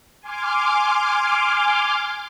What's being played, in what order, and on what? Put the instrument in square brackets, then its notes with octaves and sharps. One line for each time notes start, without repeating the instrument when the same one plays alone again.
[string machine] G#5 C6 D6 F6